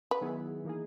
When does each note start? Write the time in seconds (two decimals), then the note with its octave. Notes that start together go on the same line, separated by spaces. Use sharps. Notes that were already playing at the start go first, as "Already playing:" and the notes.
0.11 B4
0.21 D#3 F#3 B3 E4 G#4
0.65 E3 A#3 D#4 G#4